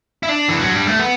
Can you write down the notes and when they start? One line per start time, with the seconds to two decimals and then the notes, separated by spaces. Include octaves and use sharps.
0.23 E4
0.29 D4
0.49 E3
0.61 F#3
0.74 G3
0.87 A3
0.99 B3